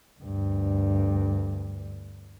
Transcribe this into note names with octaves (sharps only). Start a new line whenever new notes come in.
D2 G2